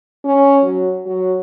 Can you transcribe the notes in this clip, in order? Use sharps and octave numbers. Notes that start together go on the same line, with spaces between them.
C#4
F#3
F#3